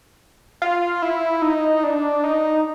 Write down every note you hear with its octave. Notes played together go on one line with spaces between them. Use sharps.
F4
E4
D#4
D4
D#4